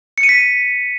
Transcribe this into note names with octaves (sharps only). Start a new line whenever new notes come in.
C#7
D#7
B6